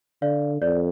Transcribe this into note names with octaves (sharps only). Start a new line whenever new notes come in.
D3 D5 F5
F2 D5